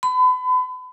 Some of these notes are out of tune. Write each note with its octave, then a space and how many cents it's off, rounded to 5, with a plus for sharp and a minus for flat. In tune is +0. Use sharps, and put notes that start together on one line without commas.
B5 +35